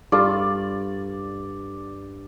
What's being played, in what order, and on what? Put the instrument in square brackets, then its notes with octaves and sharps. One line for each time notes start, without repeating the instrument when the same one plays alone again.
[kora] G2 F4 A4 [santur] D5